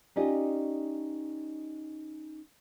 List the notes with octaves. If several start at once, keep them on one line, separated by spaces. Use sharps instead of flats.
C#4 D#4 F4 G4 D5 D#5